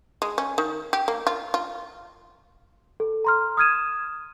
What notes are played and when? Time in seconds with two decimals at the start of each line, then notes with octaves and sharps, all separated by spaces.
0.22 G#3
0.38 C#4
0.58 D#3
0.93 G4
1.08 A#3
1.27 F4
1.54 F4
3.00 A4
3.25 A#5 C6 F6
3.57 D#6 F6 G#6 D#7 E7